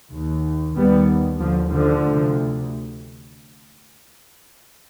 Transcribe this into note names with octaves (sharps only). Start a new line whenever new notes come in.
D#2
D#2 G3 B3
D#2 D3 F3
D3 F3
D2 C3